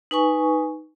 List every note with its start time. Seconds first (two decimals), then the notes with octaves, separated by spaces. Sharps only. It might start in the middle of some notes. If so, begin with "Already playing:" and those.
0.11 D#4 B4 G#5 C#6